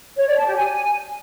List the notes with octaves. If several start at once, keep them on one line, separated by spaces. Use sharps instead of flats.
C#5
D5
A5
G4
G#5